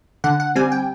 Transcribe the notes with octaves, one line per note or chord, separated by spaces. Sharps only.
D3 F#5
F#5
G3 C4 G#5
G5